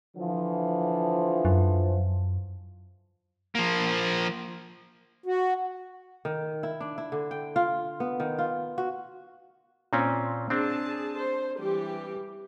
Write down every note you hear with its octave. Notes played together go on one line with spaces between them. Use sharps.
D3 E3 F3
F#2
F3 A#3
F#4
D#3
E4
D4
E4
D3
G5
F4
B3
D#3
F4
F#4
A#2 C4 C#4
C4 D4 G#4 A5
C5
E3 G3 G4